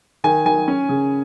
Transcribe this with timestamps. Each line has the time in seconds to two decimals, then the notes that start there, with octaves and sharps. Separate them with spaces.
0.24 D#3 G#5
0.45 D#3 G#5
0.68 C#4
0.89 C#3